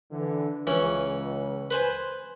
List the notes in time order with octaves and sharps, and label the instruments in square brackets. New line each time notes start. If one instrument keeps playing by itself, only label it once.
[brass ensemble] D3 E3
[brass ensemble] C#2 [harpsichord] E3 C#4
[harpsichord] B4 C5 G#5